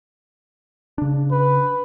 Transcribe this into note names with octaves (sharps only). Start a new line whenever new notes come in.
C#3 D4
B4